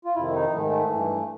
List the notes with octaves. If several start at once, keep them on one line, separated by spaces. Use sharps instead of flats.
F4
F2 C3 D#3 E4
D#4
G#2 D#3 A3
A3
G2 E3